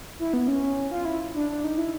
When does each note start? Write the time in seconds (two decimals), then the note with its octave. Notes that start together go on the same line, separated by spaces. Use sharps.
0.19 E4
0.33 B3
0.48 C#4
0.91 F4
1.05 E4
1.34 D4
1.50 D4
1.64 D#4
1.78 E4